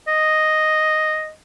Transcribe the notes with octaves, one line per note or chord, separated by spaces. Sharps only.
D#5